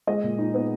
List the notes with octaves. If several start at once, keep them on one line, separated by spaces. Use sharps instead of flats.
G#3 D#5
A#2
D#4
B3